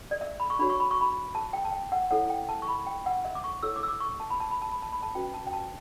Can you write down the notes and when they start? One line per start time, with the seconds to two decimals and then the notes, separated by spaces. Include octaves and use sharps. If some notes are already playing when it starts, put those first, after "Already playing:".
0.11 D5
0.21 E5
0.40 B5
0.50 C#6
0.59 D4 F#4 C#5 B5
0.70 C#6
0.80 B5
0.91 C#6
1.01 B5
1.35 A5
1.53 G5
1.65 A5
1.72 G5
1.92 F#5
2.11 E4 A4 C#5 F#5
2.30 G5
2.49 A5
2.62 C#6
2.68 B5
2.86 G5
3.06 F#5
3.25 E5
3.35 D6
3.44 C#6
3.63 E4 A4 C#5 E6
3.76 D6
3.83 E6
3.88 D6
4.00 C#6
4.20 A5
4.30 B5
4.40 A5
4.51 B5
4.62 A5
4.72 B5
4.82 A5
4.92 B5
5.03 A5
5.15 C#4 F#4 B4 G5
5.34 A5
5.47 G5
5.53 A5